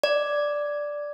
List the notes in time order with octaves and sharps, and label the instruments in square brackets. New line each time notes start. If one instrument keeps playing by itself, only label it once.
[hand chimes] D5